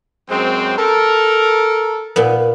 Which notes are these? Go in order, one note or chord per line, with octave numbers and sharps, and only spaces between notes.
F#2 G#3 C4
A4 A#4
A#2 B3